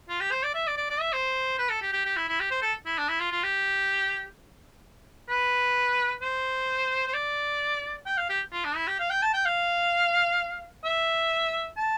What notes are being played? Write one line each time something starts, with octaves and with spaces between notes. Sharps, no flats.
F4
G4
C5
D5
E5
D5
D5
D5
E5
C5
B4
A4
G4
G4
G4
E4
E4
G4
C5
A4
E4
D4
E4
F4
F4
G4
B4
C5
C5
D5
G5
F5
G4
F4
D4
E4
G4
F5
G5
A5
G5
F5
E5
A5